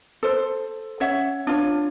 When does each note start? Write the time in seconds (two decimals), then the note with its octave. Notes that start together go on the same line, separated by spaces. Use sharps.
0.23 A4 C5
1.00 C#4 C#5 E5 F#5
1.47 D4 F4 C#5